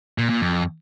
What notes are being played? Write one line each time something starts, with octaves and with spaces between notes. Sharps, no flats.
A#2
A#2
F2